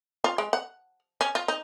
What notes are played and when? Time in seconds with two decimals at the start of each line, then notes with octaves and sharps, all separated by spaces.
0.24 F4
0.38 G#3
0.53 F#5
1.21 C#4
1.35 F4
1.48 D#4